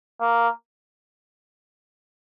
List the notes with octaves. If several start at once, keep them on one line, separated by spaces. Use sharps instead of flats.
A#3